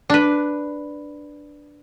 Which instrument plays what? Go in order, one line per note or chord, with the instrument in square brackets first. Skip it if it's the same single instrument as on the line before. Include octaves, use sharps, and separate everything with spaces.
[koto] D4 B4